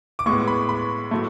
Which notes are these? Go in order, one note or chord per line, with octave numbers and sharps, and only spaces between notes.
D6
A2 G#3 B3 C#6
B5
B5
A2 F#3 A3